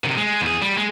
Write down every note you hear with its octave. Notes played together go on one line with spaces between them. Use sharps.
C3 D#3
G#3
E2 G#4
G3
G#3